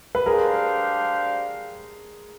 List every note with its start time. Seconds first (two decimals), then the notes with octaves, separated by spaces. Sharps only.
0.15 B4
0.26 D4 G4 G#4 A#4 C5 F5